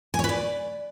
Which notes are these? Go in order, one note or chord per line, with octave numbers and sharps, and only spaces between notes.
G#5
C#5
B4
D5